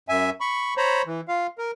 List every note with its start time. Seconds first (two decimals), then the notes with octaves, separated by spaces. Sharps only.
0.09 F#2 E5 G#5
0.41 B5 C#6
0.77 C5 C#5 A#5 B5
1.07 E3
1.28 F4 F5
1.58 A#4